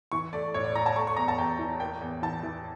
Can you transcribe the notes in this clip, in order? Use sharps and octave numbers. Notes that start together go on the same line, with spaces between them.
E3 C#6
A3 D5
A2 C#5
D5
A2 A#5
A5
A3 C#6
C#6
E2 A#5
A5
E2 G5
E3
A#3 G5
E2
E3 A5
E3